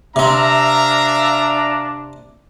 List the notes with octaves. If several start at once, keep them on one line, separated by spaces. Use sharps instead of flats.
C3 C4 D4 E5 F5 A#5